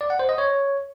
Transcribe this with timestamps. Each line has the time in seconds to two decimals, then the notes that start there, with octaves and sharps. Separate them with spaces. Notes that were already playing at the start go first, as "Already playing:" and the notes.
0.01 D5
0.10 F#5
0.19 C5
0.29 D#5
0.38 C#5